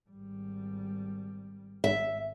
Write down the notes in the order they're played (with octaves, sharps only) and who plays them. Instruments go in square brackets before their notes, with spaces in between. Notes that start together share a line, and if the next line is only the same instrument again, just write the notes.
[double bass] G#1 G3
[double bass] G#1 [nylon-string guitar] E5